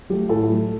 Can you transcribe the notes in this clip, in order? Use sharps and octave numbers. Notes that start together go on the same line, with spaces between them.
F#3 A3 G4
A2 A4
F#3 A3